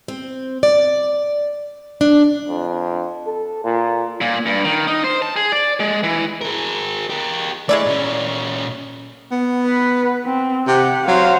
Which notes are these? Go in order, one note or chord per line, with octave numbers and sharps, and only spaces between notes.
C4
D5
D4
F2
A4
A#2
A#2
G2
D#3
D#4
C5
A5
G#4
D5
G#3
E3
G#4 A#4
G4 A#4
G#3 A3 E4 D5
A#2 C#4
B3
B4
C4
C3 G4 F#5
F#3 C5 F5